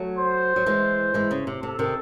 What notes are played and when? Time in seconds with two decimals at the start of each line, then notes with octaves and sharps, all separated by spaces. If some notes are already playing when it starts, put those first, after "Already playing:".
Already playing: F#3 A3
0.19 C5
0.56 F#3
0.66 E3 G#3
1.14 E3 G#3
1.31 C#3
1.47 C3
1.63 C3 A4
1.79 C3 D#3